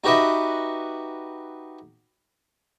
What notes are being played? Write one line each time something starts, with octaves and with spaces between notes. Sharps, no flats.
D#4 F#4 G4 B4 D#5 E5